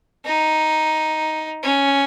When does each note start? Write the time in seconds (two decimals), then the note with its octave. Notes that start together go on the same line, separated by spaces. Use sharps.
0.25 D#4
1.63 C#4